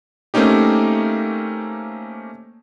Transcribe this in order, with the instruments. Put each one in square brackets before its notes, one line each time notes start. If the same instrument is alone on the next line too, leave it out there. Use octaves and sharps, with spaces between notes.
[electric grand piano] A3 A#3 C4 C#4 D#4 G4